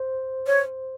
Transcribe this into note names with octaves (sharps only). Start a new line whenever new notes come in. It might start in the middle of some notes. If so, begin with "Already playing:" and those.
Already playing: C5
C#5